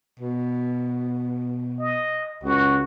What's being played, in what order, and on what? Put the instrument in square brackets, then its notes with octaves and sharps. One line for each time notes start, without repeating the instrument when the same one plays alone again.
[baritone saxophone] B2
[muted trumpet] D#5
[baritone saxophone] C#2 [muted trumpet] F#4